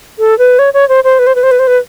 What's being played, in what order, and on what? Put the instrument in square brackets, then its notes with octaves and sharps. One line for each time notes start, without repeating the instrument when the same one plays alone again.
[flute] A4
B4
C#5
C#5
C5
C5
B4
C5
B4
C5
B4
C5
B4